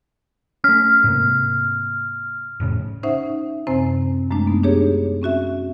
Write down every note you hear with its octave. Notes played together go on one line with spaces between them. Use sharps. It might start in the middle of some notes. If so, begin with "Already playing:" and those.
A3 C#4 F6
G#2 C3 A#3
F1 A2 C#3
C#4 D#4 C5 E5 F#5
F#2 C3 C4 C5 G#5
F#2 G#3 A3 D4
B3 D#4
D4 G4 G#4 C#5
C4 C#4 F#4 E5